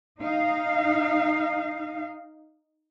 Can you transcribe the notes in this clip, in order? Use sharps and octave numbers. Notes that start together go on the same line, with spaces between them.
D#4 F5